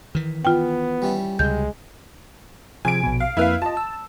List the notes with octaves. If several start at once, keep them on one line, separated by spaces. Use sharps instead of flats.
D#3 E3
B3 F4 G5
G3 C#4 E4
C#2 C3 G#3 G6
C3 F3 G#4 G#5 D7
A#1 B2
F5
F2 A#3 E4 B4 F5 F6
F4 D#5 A5
E6